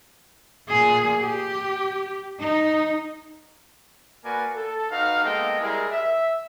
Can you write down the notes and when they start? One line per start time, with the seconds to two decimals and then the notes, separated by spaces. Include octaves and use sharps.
0.69 A#2 G#4
1.21 G4
2.40 D#4
4.25 A#3 F#4 A#4 B4 D5 G#5
4.55 A4
4.90 D#4 F#4 B4 F5
5.23 G#3 A#3 B3 A4 D#5 G5
5.59 G3 G#3 E4 G#4 A#4
5.92 E5